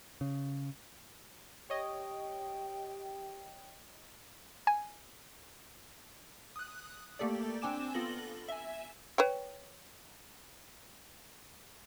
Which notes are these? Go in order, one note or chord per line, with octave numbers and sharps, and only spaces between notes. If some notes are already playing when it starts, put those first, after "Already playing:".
C#3
G4 C#5 D#5 G5
G#5
D#6 F#6
A3 A#3 G4 A4 D5
C4 D4 G5 G#5 D6 E7
B3 F4 A4 A#6 F#7 G7
E5 G#5
B4 C#5 G5